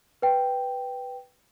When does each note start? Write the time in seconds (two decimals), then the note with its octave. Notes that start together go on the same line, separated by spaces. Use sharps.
0.22 B4 G5